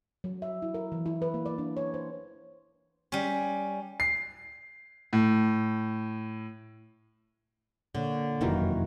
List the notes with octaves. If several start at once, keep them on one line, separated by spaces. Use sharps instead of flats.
F#3
E5
E4
A#4
E3
E4
B4
A#3
D5
D4
C#5
C5
G3 C#4
C7
A2
A#2 D3 A#3 C#5
F1 F#2 D#3 E3 A#3 F4 F#4 A#4